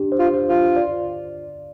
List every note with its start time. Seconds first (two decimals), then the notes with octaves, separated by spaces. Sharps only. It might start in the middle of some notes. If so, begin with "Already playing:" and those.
Already playing: D4 G4
0.12 C5
0.19 F4
0.34 C5
0.48 F4
0.76 D5